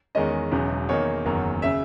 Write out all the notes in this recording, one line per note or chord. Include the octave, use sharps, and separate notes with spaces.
E2 D#3 G#3 C#4 D#5
E1 E2 C#3 F#3 B3
E2 D#3 A#3 D#4 C#5
F#1 E2 D#3 F#3
C#3 E5